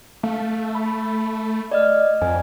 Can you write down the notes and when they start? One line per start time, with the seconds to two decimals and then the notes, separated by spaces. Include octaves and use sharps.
0.23 A3 F5
0.75 B5
1.71 D5 D#5 F6
2.22 F2 G#5